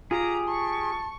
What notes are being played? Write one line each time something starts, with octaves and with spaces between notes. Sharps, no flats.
F4 G4 G#4 A#5
A5 C#6